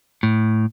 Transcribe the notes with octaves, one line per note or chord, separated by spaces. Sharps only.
A2